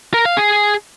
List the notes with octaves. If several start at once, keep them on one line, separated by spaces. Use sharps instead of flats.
A#4
F5
G#4